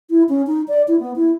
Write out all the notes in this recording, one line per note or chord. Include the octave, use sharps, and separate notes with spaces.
E4
C#4
D#4
D5
E4
B3
E4